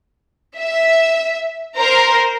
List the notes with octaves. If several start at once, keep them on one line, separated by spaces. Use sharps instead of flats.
E5
A#4 C5 A#5